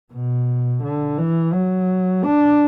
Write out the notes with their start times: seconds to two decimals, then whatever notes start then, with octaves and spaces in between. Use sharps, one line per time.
0.12 B2
0.83 D3
1.18 E3
1.53 F#3
2.24 D4